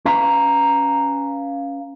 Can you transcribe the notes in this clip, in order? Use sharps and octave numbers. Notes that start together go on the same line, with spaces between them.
C#4 B4 F5 A#5